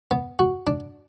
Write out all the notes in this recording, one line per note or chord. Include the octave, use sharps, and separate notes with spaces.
B3
F#4
D4